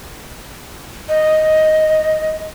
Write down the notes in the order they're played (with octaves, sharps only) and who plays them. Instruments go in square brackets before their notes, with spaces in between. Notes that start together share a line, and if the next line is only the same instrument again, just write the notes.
[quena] D#5